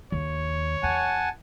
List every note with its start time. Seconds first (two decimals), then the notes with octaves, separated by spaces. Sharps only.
0.12 D#2 C#5
0.83 E2 F#5 G#5 A5